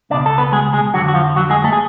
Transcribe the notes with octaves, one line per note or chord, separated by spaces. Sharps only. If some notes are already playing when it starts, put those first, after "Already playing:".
C#2 B2 D4 D5
A4
B3 B4
G#3 G#4
G#3 G#4
F2 D3 F#3 F#4
F#4
F3 F4
F#3 F#4
G#3 G#4
A3 A4
G#4